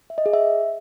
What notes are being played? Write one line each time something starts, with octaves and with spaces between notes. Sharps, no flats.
E5
D#5
G#4
E5